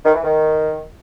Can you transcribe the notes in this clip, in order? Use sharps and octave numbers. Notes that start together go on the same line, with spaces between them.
D#3
E3
D#3